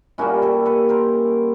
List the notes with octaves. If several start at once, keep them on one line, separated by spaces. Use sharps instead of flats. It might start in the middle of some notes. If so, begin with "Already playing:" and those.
A#2 G3 A#3 C#4 E4 F#4
G4 A4
A4 B4
A#4 C5